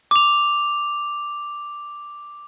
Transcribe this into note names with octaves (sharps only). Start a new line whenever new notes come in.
D6 F7